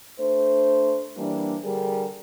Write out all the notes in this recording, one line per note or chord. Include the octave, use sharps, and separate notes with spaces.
A3 D4 C5
E3 G3 A#3 D4
D3 G3 G#4 A#4